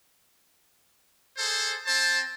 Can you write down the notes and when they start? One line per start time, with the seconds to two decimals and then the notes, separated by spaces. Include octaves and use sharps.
1.38 G#4 A4 C5
1.85 C4 C5 A5